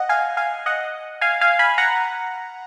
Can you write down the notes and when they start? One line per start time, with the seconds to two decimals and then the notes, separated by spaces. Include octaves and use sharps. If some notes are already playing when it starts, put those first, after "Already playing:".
Already playing: D#5 F#5
0.09 F5 G#5
0.37 F5 G#5
0.66 D#5 F#5
1.21 F5 G#5
1.41 F5 G#5
1.59 G#5 B5
1.78 F#5 A#5